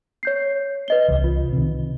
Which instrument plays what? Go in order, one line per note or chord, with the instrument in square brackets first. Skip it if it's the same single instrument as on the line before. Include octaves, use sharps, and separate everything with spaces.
[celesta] C#5 G6 C7
B4 D#5 G7
[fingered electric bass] C2 E3
[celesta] F4
[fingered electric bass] C3 D#3